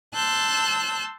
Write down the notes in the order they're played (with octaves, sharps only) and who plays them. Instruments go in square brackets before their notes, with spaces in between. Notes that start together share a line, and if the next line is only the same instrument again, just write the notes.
[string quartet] A5 C6 E6 F#6 G6